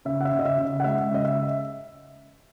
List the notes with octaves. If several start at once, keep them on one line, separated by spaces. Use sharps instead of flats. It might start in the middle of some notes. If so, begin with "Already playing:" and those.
C#3 E5
F#5
E5
C#3
D#5
E5
C#3
D#5
F#5
G#3 E5
C#3 D#5
E5